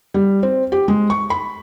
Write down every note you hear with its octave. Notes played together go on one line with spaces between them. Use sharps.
G3
C4
G4
G#3
C#6
B5